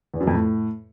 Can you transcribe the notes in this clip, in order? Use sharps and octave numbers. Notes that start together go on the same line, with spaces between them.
E2
F#2
F2
A2